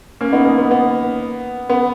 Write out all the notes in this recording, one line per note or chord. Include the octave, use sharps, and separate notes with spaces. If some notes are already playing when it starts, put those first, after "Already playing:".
A#3 C#4
B3 D#4
A#3 C#4
B3
B3
B3